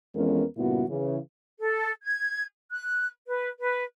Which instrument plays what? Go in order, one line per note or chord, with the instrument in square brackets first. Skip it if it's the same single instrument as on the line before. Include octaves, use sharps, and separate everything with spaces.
[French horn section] F2 E3 G#3 B3 C#4 A#4
G2 A#2 C#3 B3 E4 F#4
C#3 E3
[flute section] A4
G#6
F#6
B4
B4